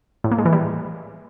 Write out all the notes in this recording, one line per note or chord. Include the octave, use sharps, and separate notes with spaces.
A2
A#3
G#3
E3
G3